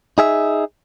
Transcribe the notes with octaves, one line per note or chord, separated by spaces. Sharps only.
D#4 G#4 E5